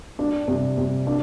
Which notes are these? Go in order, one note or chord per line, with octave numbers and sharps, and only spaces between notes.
D4
C3
C3
D4